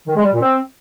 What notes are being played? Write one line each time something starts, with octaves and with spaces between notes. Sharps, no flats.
D#3
G#3
G3
A#2
C4